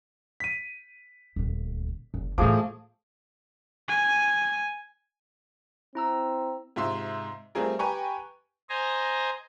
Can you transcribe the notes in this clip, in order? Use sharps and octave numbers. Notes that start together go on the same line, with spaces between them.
B6 D#7
D#1 D2
F#1
A2 E3 F3 A3 G#4 D6
G#5
C4 E4 A#5 E6
G#2 C3 F4 E5 C6
G3 A3 C4 F4 G#4 A#4
G4 B4 G5 G#5 A#5 C#6
C5 D#5 G#5 A#5